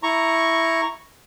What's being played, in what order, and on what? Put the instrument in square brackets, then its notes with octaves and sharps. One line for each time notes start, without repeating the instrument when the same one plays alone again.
[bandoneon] E4 A#5 C#6